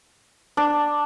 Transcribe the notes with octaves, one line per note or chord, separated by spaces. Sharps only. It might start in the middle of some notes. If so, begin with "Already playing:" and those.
D4